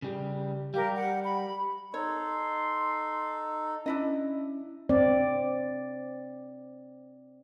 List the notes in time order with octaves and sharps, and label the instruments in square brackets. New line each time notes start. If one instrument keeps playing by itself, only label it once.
[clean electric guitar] C#3 G3
[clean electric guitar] G3 [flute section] G4 A#4 F5
[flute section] F#5
B5
[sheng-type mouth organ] D#4 A4 [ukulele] C#5 [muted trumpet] C6
[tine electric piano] C#4 [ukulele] D4 E4 D#5
[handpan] C4 D5